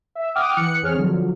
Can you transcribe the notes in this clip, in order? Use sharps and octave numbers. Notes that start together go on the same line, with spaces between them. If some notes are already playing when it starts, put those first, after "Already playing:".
E5
F#5 G5 D6 D#6 F6
E3 F#6 C#7
E2 C4 G#4 C#5 F6
D3 F3 F#3